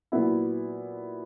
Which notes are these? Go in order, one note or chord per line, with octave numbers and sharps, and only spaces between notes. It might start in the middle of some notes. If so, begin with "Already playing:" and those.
A#2 F#3 B3 E4